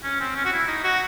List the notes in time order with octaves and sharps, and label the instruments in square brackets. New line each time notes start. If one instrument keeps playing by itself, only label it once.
[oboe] C#4
C4
C#4
F#4
E4
D#4
F#4